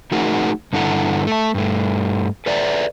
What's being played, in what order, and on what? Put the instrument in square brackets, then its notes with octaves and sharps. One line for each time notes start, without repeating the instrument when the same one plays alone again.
[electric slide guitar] F3 A3 D#4 F#4 G#4 A#4
G2 D3 E4 A4 F#5 A#5
A3 A5
G2 A3
A4 B4 D5 E5 A#5